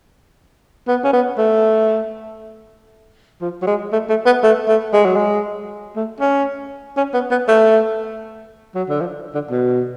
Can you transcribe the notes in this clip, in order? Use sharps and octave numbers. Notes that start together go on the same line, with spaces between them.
B3
C#4
B3
A3
F3
F#3
G#3
A3
A3
B3
A3
A3
G#3
F#3
G#3
A3
C#4
C#4
B3
B3
A3
F#3
D3
F3
D3
B2